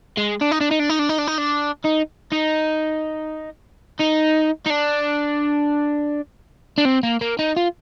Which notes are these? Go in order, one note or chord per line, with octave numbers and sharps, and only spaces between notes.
G#3
D4
D#4
D4
D#4
D4
D#4
D4
D#4
D4
D#4
D4
D#4
D#4
D#4
D#4
D4
D4
C4
A#3
A#3
D#4
F4